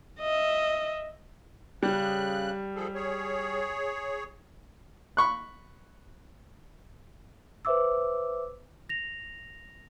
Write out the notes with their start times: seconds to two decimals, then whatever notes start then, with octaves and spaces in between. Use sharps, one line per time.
0.20 D#5 E5
1.83 C#3 G3 F#6
2.76 F3 G#4 A4
2.94 G#4 C#5
5.17 B5 C#6 F#6
7.65 B4 C5 E5 D6 E6
8.89 A#6 F7